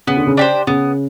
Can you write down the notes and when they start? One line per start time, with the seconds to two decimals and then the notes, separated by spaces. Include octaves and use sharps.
0.07 C#3 B3
0.17 D3
0.27 C#3
0.37 D4 G4 C5
0.67 C#3 B3